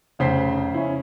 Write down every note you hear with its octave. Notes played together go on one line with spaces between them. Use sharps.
F1 C#3 C5 B6 C7
C#4 E4